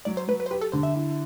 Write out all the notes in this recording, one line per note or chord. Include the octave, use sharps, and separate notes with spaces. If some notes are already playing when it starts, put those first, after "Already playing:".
F#3 D5
C5
F#3 B4
B4
C5
G4 B4
A4
D3 C5
E5
E4